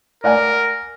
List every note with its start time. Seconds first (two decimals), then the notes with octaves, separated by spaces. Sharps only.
0.24 A#4 D5 F#5 G#5